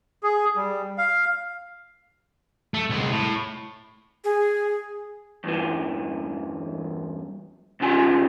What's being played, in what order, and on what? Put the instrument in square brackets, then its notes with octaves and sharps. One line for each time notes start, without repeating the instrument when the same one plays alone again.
[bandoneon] G#4
G3
F5
[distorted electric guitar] A3
C2 G#3
A2
[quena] G#4
[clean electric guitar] E2 G2 E3
C2 G2 C#3 F4 G#5